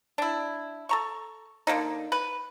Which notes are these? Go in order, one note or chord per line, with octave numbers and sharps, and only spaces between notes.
D4 E4
A4 A#5 C#6
D3 A#3 D4 D#4
B4